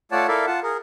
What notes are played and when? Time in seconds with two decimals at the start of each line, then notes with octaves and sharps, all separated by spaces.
0.12 A3 F4 C#5 D5 F#5 A5
0.28 E4 A4 A#4 D5 E5 F5
0.47 F4 F#5 A5
0.63 G#4 A#4